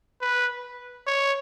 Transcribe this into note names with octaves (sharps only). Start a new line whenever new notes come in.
B4
C#5